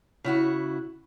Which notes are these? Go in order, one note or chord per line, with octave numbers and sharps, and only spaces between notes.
C#3 E4 F#4 F#5